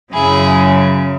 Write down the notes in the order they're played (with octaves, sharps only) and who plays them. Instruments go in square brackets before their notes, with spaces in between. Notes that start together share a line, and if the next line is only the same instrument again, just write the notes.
[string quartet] F#2 C#3 F#3 E4 G#4